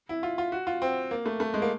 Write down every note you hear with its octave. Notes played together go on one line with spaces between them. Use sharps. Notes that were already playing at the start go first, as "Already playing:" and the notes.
E4
F4
F4
F#4
F4
C4
A#3
A3
A3
G#3
A#3